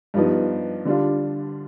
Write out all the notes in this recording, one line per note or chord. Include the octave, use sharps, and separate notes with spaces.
G2 F3 B3 D#4
D3 G3 D4 F4